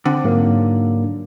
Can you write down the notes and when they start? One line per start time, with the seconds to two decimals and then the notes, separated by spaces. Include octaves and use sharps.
0.05 D3 C4
0.24 G#2 F#3 A#3